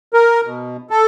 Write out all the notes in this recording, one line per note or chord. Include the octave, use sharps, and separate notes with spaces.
A#4
B2
A4